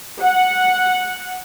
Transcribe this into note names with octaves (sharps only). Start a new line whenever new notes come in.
F#5